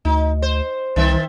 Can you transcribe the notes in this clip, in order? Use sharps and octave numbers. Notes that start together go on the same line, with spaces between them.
D2 D#4
C5
C2 D#3 C4 E5